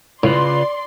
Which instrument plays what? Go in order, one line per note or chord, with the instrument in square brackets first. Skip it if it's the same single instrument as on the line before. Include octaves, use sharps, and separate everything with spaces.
[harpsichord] A2 [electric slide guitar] C#3 F4 B4 [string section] D5 C6